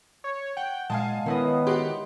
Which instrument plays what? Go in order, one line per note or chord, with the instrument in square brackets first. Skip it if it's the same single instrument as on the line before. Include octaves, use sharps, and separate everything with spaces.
[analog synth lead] C#5
[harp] F#5 [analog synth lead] G5
[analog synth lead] A#2 [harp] G#3 [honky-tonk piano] F5 G#5 A5
[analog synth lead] D#3 [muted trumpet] B3 [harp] C#4 E4 D#5
[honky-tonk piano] F#4 G4 [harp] C6